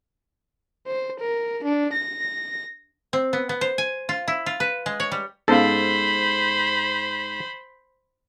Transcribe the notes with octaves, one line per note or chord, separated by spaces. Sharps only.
C5
A#4
D4
A#6
C4
B3
B3
C5
G#5
F4
E4
F4
B4
G#3
C#5
G3
G#2 B3 C#4 A4 C5 F5 A5 B5